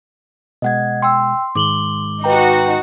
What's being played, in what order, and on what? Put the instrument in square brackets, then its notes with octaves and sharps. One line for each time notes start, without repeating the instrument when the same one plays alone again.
[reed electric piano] B2 G#3 [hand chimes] D#5 F#5 G#6
[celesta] G5 E6 [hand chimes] C6
[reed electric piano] G#2 D#3 G#3 [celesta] D6 F#7 G7
[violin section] D#4 F#4 [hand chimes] B4 G5 A#5